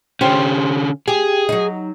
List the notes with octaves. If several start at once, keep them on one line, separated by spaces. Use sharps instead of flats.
D3 C#4 F4 G4 C5
G4 G#4
F#3 D#4